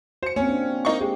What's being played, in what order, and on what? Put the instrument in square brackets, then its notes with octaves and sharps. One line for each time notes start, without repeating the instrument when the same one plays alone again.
[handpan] F#4 [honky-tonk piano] C5 C#7
[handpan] A#3 C4 [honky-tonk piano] C#4
[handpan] D4
[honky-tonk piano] A#3 D#4 C#6
[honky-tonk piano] G#3 [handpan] G4